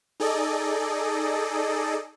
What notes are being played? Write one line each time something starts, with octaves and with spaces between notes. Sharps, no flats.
D#4 G#4 A4 D5 D#5